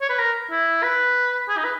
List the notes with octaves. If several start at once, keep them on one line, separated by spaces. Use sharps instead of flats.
C#5
B4
A#4
E4
B4
G#4
D#4
B4